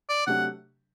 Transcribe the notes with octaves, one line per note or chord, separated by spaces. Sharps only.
D5
C3 F#3 A3 D4 G4 F#5